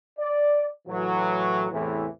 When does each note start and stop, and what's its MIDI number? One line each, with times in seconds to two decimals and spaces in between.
0.19 0.67 74
0.88 1.66 45
0.88 1.66 52
0.88 1.66 54
1.72 2.07 40
1.72 2.07 45
1.72 2.07 48
1.72 2.07 52